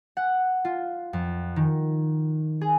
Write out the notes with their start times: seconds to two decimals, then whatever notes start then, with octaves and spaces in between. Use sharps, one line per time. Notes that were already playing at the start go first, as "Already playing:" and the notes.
0.17 F#5
0.65 F4
1.13 F2
1.56 D#3
2.61 G#4